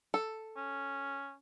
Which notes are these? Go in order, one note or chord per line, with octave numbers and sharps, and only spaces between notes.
A4
C#4